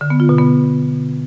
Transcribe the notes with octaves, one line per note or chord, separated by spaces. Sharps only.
D3
B3
F4
B2
B3